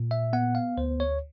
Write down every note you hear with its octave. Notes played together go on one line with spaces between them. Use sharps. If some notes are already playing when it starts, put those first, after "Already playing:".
Already playing: A#2
E5
B3 F#5
F5
D2 C5
C#5